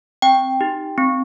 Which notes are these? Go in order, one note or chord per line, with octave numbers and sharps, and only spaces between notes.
C4 G5
D#4 G4
C4